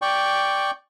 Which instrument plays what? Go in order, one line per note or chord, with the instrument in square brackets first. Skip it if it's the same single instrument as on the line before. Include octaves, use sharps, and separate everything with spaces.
[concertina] D5 G5 C#6